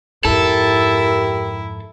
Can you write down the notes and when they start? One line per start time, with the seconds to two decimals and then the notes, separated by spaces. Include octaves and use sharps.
0.25 F2 G#2 E4 G4 A4 A#4